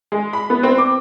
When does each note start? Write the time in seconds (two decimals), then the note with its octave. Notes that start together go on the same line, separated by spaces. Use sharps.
0.12 G#3
0.33 B5
0.50 B3
0.63 C4
0.78 D6